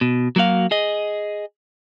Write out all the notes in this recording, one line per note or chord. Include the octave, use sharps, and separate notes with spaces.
B2
F#3 A#3 F#4 F5
G#4 D#5